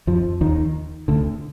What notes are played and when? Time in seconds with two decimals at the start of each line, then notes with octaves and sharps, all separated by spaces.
0.07 F2 F3
0.41 D#2 D#3
1.08 D2 D3